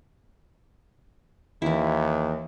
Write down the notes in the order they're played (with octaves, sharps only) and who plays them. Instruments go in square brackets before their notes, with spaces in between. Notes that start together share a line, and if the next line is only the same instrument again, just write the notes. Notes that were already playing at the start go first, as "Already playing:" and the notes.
[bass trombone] D#2 [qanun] E3 E4